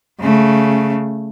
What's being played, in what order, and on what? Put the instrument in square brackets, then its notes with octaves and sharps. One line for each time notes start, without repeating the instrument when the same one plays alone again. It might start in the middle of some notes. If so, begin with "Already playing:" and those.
[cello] C#3 A3